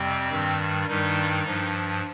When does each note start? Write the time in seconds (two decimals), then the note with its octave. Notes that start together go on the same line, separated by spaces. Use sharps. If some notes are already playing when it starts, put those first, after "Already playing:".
Already playing: F2 C3 G3 C4
0.31 G2 D#3 G3
0.88 G2 D#3 G3 D#4
1.45 G2 F3